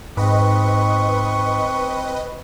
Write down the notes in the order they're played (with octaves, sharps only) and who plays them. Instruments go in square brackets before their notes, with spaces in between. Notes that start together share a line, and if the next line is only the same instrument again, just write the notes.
[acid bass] G#2 [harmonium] C4 [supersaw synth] B4 D#5 [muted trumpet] C#6